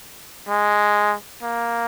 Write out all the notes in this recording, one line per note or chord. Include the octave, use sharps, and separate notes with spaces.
G#3
A#3